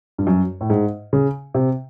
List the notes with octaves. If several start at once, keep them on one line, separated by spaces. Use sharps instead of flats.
G2
F#2
A2
G#2
C#3
C3